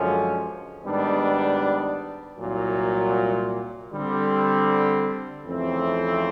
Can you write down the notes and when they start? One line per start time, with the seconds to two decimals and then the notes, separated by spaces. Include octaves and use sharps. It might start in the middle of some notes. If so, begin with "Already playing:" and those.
Already playing: F#2 D3 F3 G#3 C#4
0.85 G#2 D#3 G3 B3 D4
2.38 C2 A#2 F#3
3.92 D3 G3 C4
5.45 F2 C#3 E3 A3 C4